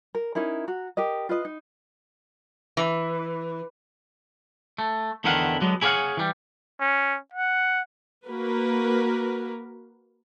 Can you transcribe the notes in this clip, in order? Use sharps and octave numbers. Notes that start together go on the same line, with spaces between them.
A#4
C#4 D#4 E4 A#4
F#4 A#5
G4 A#4 D#5
F4 B4 D#5
D#4
E3
A3
E2 D3 D#3 E4 F5 F#5
D3 F#3 G#3 B3
E4 G#4 C#5 D5 F5 F#5
E3 G3
C#4
F#5
A#3 F#4 A#4 B4